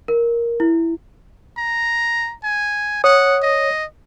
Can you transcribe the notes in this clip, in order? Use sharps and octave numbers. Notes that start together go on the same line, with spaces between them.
A#4
E4
A#5
G#5
C#5 F#5 D#6
D#5